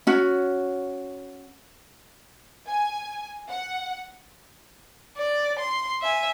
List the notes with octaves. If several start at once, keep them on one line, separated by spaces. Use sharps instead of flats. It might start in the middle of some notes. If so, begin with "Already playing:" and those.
C#4 F#4
G#5
F#5
D5
C6
E5 G#5